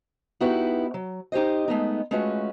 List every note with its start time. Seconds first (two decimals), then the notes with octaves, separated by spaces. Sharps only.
0.40 B3 D#4 E4 F#4 G4 B4
0.94 F#3
1.32 D#4 G4 G#4 C5 D#5
1.68 G#3 A3 B3 D#4
2.11 G#3 A3 C#4 F4 F#4 B4